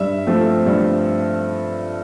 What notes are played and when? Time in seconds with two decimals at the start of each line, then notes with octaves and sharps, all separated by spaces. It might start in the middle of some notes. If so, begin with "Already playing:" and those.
Already playing: G2 E5
0.27 F3 A3 C4
0.66 G2